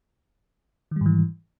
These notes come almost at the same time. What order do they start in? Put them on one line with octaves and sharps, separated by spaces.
D#3 G3 G#2 E3